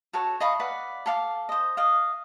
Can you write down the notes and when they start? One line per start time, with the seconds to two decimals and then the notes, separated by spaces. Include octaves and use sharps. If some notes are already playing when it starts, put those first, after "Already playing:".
0.13 F#4 A4 C#5
0.40 D#5 F5 B5 C#6
0.60 B4 D5 F5 F#5
1.06 A4 F5 D6
1.49 C5 D#5
1.77 D#5 F5